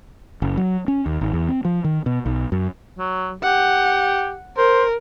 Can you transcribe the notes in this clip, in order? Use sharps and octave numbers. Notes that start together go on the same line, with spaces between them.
F#1
F#3
C#4
D#2
G#1
E2
C4
F3
D#3
B2
B1
F#2
F#3
G4 F#5
A#4 C5